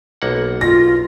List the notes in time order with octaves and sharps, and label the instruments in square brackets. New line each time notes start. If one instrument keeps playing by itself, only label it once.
[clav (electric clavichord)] B1 A#3 F#5
[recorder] F4 [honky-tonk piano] A#6